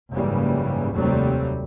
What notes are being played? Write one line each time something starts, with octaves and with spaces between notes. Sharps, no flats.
F#1 G#2 C#3 E3 G3 A#3
F1 D#2 F#3 G3 A3 C4